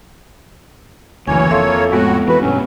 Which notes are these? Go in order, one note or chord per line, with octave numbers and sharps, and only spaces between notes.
F#1 D2 E3 A#3 C#5 G#5
F2 A4 E5 F5 C6
A2 G#3 B3 F#4
E3 F#4 B4
G2 B2 F#3 C#4